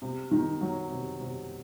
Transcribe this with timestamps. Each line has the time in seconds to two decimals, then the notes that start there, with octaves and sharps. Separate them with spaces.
0.02 C3
0.31 D#3
0.61 F#3
0.90 C3
1.20 C3